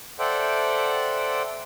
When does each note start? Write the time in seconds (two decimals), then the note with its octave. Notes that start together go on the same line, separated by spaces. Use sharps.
0.19 A4 C5 D5 E5 F#5 G5